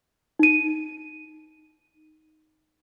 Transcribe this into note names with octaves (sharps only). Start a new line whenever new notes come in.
D#4 D#7